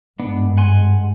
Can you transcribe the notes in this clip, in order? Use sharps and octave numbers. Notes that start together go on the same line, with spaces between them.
G#1 G2 G#3 B3 D4
F#5 G#5 C6